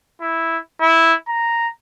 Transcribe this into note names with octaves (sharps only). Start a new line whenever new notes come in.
E4
E4
A#5